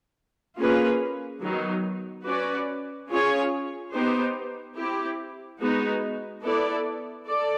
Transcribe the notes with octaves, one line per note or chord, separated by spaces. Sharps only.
A#3 C#4 F4 G#4 B4
D#3 F#3 B3 D#4
C#4 F#4 B4 D5
C#4 F4 G#4 C#5
B3 D#4 G4 C5
C4 E4 G4
G#3 B3 D#4 F#4
B3 E4 A4 D5
A4 D5